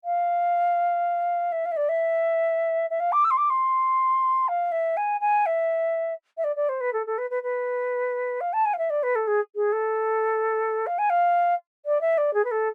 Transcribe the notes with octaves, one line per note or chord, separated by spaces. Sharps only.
F5
E5
F5
E5
D5
E5
E5
F5
D6
E6
C6
D6
C6
F5
E5
G#5
G#5
E5
E5
D5
D5
C5
B4
A4
A4
B4
B4
B4
F5
A5
G#5
F5
E5
D5
B4
A4
G#4
G#4
A4
F5
G#5
F5
D5
E5
D5
G#4
B4
A4